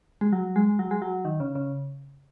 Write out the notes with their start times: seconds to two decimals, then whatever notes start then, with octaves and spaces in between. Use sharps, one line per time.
0.21 G#3
0.33 F#3
0.56 G#3
0.79 F#3
0.91 G#3
1.02 F#3
1.25 D#3
1.40 C#3
1.55 C#3